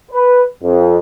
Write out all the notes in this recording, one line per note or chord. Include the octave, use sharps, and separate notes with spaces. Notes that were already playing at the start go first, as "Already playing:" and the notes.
B4
F2